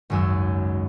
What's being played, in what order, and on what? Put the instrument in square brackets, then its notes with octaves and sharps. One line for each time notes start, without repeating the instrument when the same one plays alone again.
[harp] G#1 C#2 F#2 G#5 E6